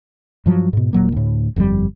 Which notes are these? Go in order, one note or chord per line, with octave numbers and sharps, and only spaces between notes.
G2 F3 F#3
G#2 B2
D#1 A#2 F#3 A#3
D2 A2
G1 F2 B2 G3